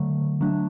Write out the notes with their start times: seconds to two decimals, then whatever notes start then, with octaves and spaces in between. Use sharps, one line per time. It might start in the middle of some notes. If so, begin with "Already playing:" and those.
Already playing: D3 F#3 A3
0.41 F#3 A3 D4